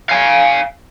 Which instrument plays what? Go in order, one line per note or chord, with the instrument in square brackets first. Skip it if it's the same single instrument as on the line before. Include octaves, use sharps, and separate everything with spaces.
[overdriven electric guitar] F5 G#5